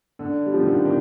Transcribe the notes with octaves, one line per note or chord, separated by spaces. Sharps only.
D3
G3
F3
D#3
D3
D#3